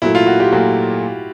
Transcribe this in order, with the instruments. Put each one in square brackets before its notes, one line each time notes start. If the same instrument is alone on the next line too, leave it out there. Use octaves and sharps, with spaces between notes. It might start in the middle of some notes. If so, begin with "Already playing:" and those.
[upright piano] A#2 F#3 A3 [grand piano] E4
[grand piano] F4
F#4
G4
[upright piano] A#2 F#3 A3 [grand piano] F#4